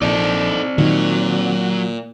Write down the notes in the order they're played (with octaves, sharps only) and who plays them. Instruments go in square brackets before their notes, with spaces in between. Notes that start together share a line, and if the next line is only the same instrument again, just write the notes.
[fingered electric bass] A#1 [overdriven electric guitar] C4 D5 [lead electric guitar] D#4 A4
[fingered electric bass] A#2 [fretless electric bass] D#3 [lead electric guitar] F#3